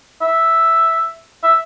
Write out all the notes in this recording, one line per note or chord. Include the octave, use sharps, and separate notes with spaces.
E5
E5